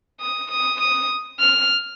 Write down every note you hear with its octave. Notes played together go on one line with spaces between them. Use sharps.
D#6
D#6
D#6
F6